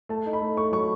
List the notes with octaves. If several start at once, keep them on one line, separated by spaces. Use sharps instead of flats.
A3 A5
D#4
B5
A3
A3 C#6
F#3 C#6